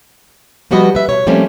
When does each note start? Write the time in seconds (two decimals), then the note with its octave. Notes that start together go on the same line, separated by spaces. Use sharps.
0.71 F3 G3 B3 F#4 B4 D#5
0.95 B4 E5
1.09 B2 C#5
1.27 F3 G3 A3 A#3 C4 C#4